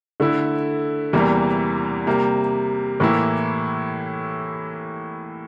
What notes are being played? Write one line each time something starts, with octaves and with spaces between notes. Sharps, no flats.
D3 A3 E4
E2 C3 E3 G3 A#3
C3 G3 A#3
A2 E3 A#3 E4